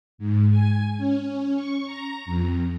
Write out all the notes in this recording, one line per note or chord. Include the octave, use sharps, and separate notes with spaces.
G#2
G#5
C#4
C#6
A#5
F2